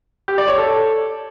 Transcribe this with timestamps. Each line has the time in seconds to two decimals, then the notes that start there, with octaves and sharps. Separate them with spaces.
0.28 G4
0.38 D5
0.48 C#5
0.58 A4